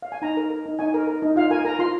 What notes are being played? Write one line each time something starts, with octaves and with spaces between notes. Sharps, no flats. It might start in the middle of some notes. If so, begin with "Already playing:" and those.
F5
G#5
D#4 A#5
A#4
A#4
D#4
D#4 G#5
A#4
A#4
D#4
F4 F5
A#4 G#5
A#4 A#5
F4 C6